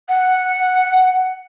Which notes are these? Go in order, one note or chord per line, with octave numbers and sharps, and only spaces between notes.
F#5